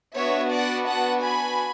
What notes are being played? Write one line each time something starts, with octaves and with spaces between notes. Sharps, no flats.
B3 D4 F#4 C#5 E5
D5 F#5
F#5 A5
G#5 B5